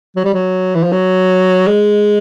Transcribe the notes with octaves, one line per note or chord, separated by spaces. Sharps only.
F#3
G3
F#3
E3
F3
F#3
G#3